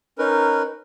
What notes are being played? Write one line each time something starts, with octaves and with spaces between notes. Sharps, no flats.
C#4 D#4 A#4 B4